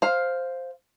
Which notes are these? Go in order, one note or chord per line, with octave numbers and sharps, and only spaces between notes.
C5 F5